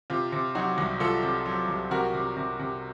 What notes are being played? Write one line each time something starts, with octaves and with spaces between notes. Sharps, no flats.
C3 F4
C3
F#3 D#4 F#4
C2
C2 F4 A4
C3
F#3
C2
C3 F#4 A#4
C3
C3
C3